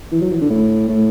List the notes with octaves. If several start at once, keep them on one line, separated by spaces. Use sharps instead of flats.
E3
F#3
E3
D3
A2
A2